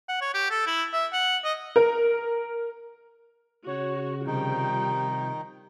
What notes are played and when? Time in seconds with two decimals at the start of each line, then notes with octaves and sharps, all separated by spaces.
0.08 F#5
0.21 C#5
0.34 G4
0.50 A4
0.67 E4
0.93 E5
1.13 F#5
1.44 D#5
1.76 A#4
3.67 C#3 F#4 C#5
4.27 C3 D#3 F3 G3 D#4 G5